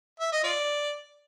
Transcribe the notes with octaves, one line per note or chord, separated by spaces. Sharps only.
E5
D#5
F4 D5